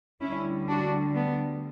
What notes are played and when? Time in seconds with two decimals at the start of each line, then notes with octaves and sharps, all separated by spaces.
0.21 D2 D3 G3 C#4 E4
0.68 D4 F#4
1.15 B3 D4